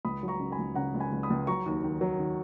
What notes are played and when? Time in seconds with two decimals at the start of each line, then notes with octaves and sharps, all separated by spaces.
0.05 C#2 B5 D#6
0.23 F#3
0.28 A#5 C#6
0.40 C#3
0.52 G#5 B5
0.59 C#2
0.75 C#3 F#5 A#5
0.94 C#2
1.00 G#5 B5
1.12 C#2
1.23 B5 D#6
1.30 C#2
1.47 F#3 A#5 C#6
1.66 D#2
1.84 D#3
2.01 F#3
2.19 D#3